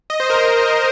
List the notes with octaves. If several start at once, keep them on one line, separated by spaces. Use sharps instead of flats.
D#5
C5
A#4